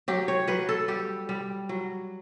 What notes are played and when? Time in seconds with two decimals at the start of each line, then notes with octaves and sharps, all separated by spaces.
0.08 F#3 G4
0.28 C#5
0.48 F#3 B4
0.69 A4
0.88 G3 G4
1.29 G3
1.69 F#3